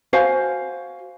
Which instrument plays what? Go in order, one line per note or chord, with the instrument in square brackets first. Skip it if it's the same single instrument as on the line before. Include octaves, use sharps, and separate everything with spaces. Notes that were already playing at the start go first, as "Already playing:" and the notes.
[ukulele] F#4 C5 F5 G#5